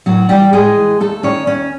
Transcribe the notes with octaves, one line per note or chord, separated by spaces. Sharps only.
A2 F#3 F#4
E3 G3 G4
A2 G#3 G#4
E3
D#2 A3 A4
D#3 C#4 C#5
D#2 C#4 C#5